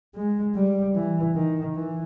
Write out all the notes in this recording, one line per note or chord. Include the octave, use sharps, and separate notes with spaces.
G#3
G3
E3
D#3
E3